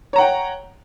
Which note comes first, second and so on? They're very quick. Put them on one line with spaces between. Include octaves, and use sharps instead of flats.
C#5 A#5 F#5 G5